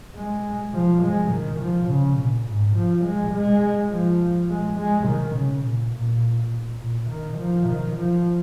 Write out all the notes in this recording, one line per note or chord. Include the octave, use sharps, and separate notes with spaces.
G#3
F3
G#3
D#3
F3
C#3
A#2
G#2
F3
G#3
G#3
F3
G#3
G#3
D#3
C#3
A#2
A#2
A#2
D#3
F3
D#3
F3